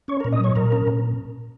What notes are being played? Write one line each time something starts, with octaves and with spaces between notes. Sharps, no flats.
C#4 C#5 C#6
A#4 A#5
A#2
D#5 D#6
F#3 C#5 C#6
A#2 A#4 A#5
C#4
A#2